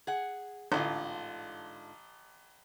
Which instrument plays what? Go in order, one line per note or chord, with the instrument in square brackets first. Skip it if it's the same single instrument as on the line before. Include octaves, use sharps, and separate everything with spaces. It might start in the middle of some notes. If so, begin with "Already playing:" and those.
[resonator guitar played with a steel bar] G#4 F#5
[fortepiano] A1 [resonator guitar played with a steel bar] G#2 D3 F4